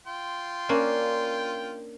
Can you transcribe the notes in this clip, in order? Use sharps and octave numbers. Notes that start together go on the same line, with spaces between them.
F4 G5 C6
A#3 C#4 D4